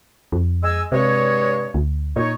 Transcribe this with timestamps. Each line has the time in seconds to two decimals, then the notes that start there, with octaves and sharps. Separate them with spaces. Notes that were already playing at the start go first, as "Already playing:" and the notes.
0.32 F2
0.63 G#3 G#5 E6
0.92 G2 C3 G#3 C#5
1.74 D2
2.16 A#2 D#4 C#5